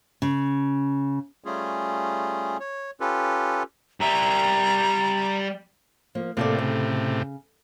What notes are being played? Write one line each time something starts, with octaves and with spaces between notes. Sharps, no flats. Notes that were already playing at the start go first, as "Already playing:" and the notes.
C#3
G3 A3 C#4 F4 G#4
C#5
C#4 F4 G4 A4 B4
G3 E5 A#5
F3 A#3
A2 C3 A#3 A4 D5
C#3